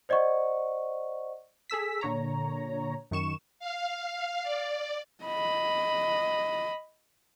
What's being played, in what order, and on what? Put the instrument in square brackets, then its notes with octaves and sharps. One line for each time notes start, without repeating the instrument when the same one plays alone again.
[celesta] C5 D5 D#5 F#5 C#6
[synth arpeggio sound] G#4 A4 E6 B6
A#2 D3 C#5 A#5
F#2 D#3 C#6 E7
[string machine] F5
D5
[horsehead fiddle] D#5 B5